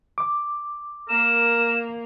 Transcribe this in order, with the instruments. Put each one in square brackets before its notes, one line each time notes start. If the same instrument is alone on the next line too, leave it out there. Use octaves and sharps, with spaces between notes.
[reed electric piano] D6
[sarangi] A#3 [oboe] A#4 [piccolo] E7